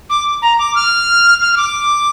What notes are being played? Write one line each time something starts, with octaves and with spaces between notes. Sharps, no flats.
D6
A#5
D6
F6
F6
F6
D6